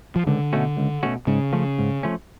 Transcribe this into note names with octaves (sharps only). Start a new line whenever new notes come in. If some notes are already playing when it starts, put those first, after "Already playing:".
F3
C#2 D3
B2 A3 C#4 F#4
C#2
B2 A3 C#4 F#4
G#2 C#3
F3 A3 C#4
G#2
F3 A3 C#4